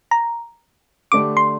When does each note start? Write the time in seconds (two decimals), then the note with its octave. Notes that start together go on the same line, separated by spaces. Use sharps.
0.11 A#5
1.12 D3 A3 D4 G4 D6
1.37 C6